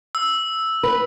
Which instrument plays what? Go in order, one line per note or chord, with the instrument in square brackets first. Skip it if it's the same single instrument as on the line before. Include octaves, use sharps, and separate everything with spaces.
[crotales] E6
[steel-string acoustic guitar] B4